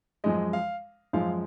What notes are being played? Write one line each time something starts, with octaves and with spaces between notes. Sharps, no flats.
F#2 F3 G#3 D#5
F5
F#2 F3 G#3 F5